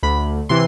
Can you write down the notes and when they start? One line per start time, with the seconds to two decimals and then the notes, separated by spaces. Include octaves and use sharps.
0.03 D2 B5
0.49 C3 E3 C6